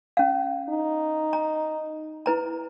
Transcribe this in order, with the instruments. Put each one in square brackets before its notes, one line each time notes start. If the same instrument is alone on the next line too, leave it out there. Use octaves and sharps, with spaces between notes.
[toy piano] C#4 F5
[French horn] D#4
[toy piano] A#5
E4 B4 A#5